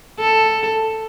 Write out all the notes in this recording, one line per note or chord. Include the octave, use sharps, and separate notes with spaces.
A4